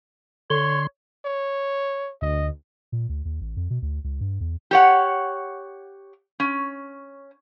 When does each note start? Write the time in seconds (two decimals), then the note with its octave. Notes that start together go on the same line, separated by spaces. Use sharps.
0.50 D3 C#5 C6
1.26 C#5
2.22 D2 D#5
2.92 A#2
3.09 D2
3.25 D#2
3.41 A1
3.57 F2
3.70 B2
3.82 D2
4.04 C#2
4.21 G2
4.41 E2
4.71 G4 C#5 F#5
6.40 C#4